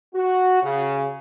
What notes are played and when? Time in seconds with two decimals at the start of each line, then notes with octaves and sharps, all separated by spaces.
0.14 F#4
0.63 C#3